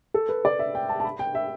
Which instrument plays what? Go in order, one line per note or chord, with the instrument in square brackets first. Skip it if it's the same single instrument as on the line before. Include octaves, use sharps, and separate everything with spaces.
[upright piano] A4
B4
D5
E5
G5
A5
A5
B5
G5
E5